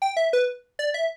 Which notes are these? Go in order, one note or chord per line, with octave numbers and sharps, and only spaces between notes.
G5
E5
B4
D5
E5